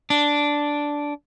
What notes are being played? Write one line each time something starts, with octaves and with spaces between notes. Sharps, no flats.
D4